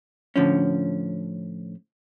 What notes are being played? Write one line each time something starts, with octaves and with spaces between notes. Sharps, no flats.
A2 D3 F3 C#4